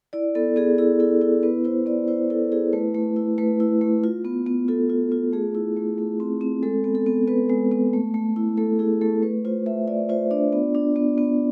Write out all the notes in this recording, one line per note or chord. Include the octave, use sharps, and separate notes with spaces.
E4 D5
B3 A4
B3 G#4
E4 G#4
E4 A4
E4 A4
B3 B4
E4 C5
B3 D5
E4 C5
E4 A4
E4 G#4
A3 B4
A3
E4
A3 B4
E4
A3
F4
B3
B3
F4 A4
F4
F4
A3 G#4
E4
A3
A3
C4
C4
G#3 A4
B3
A4
B3
B3 B4
G#3
B3
A3
A3
E4
A3 A4
E4 G#4
A3 A4
A3 B4
F4 C5
A3 E5
F4 D5
F4 C5
D4 D5
B3
D4
B3
B3